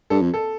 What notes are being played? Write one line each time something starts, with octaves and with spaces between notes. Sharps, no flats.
G2 A4
F2
A4